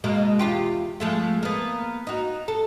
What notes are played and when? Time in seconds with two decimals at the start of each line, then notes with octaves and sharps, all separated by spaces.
0.04 B2 G#3 A#3
0.39 E2 F4 G4
1.00 F3 G#3 A3
1.43 A#3 B3
2.07 D#4 F#4
2.48 A4